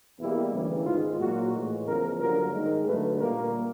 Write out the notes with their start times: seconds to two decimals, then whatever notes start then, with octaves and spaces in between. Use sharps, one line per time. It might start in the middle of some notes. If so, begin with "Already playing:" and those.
0.19 E2 B2 G3 A#3 E4
0.52 D2 C#3 E3
0.85 G#2 D#3 G#3 F4
1.19 A#2 F#3 A#3 F#4
1.52 A2 E3 G#3
1.85 E2 C#3 F3 A#4
2.18 G2 D3 F#3 A#3 A#4
2.52 G#2 D#3 G#3
2.85 G2 D3 F#3 A3 B4
3.19 A#2 G3 A#3 A#4